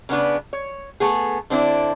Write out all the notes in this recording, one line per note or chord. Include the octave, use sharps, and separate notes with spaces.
C#3 A#3 B3 D4 B4
C#5
A3 B3 G#4
D3 C4 D4 E4